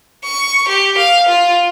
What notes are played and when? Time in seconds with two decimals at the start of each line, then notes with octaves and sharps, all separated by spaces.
0.24 C#6
0.68 G4
0.98 F5
1.29 F4